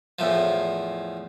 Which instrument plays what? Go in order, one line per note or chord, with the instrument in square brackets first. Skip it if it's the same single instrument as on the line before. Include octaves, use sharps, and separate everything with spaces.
[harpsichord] E2 A2 F3